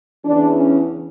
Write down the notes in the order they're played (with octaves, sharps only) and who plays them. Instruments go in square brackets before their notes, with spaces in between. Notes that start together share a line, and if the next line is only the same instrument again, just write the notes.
[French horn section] E2 C#3 E3 D4
C#4